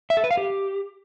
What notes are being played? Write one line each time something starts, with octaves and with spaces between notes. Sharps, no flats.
E5
A4
B4
F5
G4